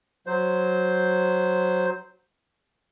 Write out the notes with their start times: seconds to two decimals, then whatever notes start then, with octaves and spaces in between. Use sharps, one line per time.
0.26 F#3 C5